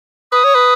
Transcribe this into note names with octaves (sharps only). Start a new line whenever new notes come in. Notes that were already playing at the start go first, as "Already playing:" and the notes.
B4 D#6
C#5
B4